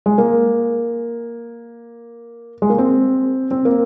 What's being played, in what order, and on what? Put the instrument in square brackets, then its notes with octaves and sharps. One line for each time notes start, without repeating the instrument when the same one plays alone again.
[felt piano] G#3
A#3
G#3
A#3
C4
C4
A#3